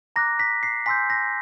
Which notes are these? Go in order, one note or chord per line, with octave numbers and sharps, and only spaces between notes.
A#5 D6 F#6 A#6
B6
C7
G#5 C6 E6 G6 B6
A#6